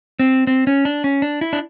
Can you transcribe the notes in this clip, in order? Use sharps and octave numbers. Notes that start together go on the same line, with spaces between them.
C4
C4
C#4
D4
C#4
D4
E4
D4